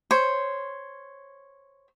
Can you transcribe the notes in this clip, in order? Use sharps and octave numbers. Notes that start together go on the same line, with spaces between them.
C5 C#5